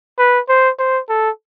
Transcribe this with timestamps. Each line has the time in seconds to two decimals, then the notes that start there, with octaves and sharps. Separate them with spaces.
0.19 B4
0.49 C5
0.79 C5
1.09 A4